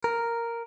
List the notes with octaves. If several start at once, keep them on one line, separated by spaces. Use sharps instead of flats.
A#4